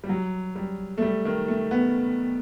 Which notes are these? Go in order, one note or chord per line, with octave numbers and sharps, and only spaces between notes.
G3
F#3
G3
A3
G3
D#3
A3
B3